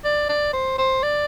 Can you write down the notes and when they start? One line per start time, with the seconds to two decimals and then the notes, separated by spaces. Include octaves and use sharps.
0.05 D5
0.29 D5
0.53 C5
0.78 C5
1.03 D5